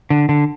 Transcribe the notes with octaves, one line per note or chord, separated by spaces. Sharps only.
D3
D3